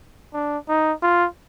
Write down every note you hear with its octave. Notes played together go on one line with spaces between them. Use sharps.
D4
D#4
F4